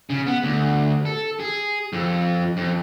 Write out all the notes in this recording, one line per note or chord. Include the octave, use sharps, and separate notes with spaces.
C#3
B3
D2
A4
G#4
F2
F2